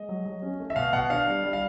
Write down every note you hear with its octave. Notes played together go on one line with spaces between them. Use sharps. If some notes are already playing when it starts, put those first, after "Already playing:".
Already playing: G#3 D#5
F#3
F#3
C#4
A3
E5
B2 F5
B2 F#5
D4 F5
G3
G3
F5